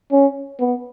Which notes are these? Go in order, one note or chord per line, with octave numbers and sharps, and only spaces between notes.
C#4
B3